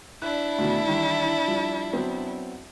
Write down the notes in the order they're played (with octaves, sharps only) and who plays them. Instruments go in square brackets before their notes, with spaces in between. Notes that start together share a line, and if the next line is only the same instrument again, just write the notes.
[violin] D4 E4 [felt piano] F#6
[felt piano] D2 B2 D#3
D#3 E3 G3
F3 G3
F#3 B3 C4